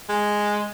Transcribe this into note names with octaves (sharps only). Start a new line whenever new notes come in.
G#3